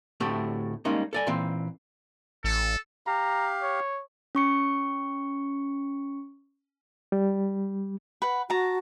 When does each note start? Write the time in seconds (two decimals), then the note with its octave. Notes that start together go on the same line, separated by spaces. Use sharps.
0.20 D2 A2 A3 C4 G4
0.85 G3 G#3 A#3 C#4 D#4
1.13 A4 D5 G#5
1.27 A#2 E3 C4
2.44 A1 A4
3.07 G4 F5 A#5
3.63 C#5
4.35 C#4 C#6 C#7
7.12 G3
8.22 B4 F#5
8.50 F#4 A5 A#5